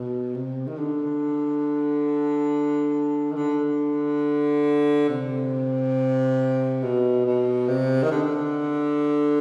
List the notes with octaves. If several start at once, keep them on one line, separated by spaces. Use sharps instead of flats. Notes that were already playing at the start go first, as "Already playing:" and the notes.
Already playing: B2
C3
D#3
D3
D#3
D3
C3
B2
B2
C3
D#3
D3